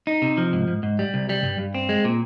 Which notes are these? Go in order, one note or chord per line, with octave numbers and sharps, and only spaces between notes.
D#4
C3
F3
G#2
G#2
G#2
G3
C2
G3
G2
G2
C4
G#3
A#2